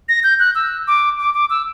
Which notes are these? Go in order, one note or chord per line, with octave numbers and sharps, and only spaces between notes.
A#6
G6
F#6
E6
D6
D6
D6
E6